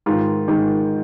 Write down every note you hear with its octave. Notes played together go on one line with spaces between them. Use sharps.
G#2 D#3 F4
G#2 D#3